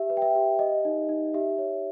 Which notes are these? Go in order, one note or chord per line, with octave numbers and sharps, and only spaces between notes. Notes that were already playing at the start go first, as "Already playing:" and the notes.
Already playing: G4 E5
B4
G5
E5
G4
G4 D#5
D#4
D#4
G4 E5
C#5